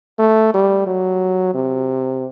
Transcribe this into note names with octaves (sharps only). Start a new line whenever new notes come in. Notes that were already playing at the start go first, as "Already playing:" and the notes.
A3
G3
F#3
C3